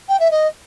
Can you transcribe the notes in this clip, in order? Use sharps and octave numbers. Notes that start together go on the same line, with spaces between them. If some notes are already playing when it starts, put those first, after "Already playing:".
G5
E5
D#5